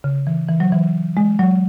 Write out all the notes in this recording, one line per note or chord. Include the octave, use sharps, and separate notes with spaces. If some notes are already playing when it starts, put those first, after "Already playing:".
C#3
E3
E3
F#3
E3
G#3
F#3